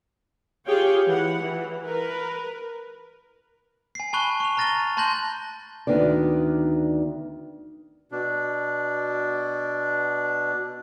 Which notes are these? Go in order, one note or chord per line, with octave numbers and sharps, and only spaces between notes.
F4 G4 G#4 C#5 F5 G5
E3 F#5
E3
A#4 B4
G#5 C7
G#5 A5 B5 C#6 F#6 G7
C#6 F7
A#5 F6 A6 A#6 D#7 G7
A5 C6 F#6 G6 A#6 F#7
D2 D#3 B3 D4 D5
B2 D4